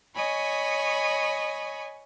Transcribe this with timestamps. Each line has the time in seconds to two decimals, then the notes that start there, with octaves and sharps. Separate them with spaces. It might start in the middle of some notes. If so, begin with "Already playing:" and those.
0.15 C#5 D#5 G#5 B5 C#6